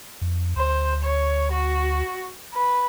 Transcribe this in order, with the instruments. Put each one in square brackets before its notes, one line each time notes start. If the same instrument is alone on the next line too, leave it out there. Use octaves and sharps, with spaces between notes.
[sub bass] F2
[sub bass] D2 [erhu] C5
[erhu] C#5
F#4
B4